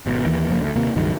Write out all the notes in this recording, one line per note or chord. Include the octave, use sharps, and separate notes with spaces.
G#1 B2
D#2 E3 A#3
F#1 F3 A#3
D2
D#2 C3 A#3
C#2 G2 D#3 F#3